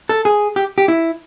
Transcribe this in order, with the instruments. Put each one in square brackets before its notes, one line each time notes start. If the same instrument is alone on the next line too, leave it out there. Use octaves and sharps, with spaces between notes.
[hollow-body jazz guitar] A4
G#4
G4
G4
E4